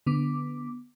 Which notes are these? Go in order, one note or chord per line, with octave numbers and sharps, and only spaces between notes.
D3 B3 D6